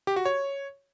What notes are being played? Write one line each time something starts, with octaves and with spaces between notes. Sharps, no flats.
G4
F#4
C#5